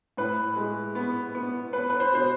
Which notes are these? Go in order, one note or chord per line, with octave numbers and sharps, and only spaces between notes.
A2 B4
G#3
B3
B3
B3 B4
B4
C5
B2 C5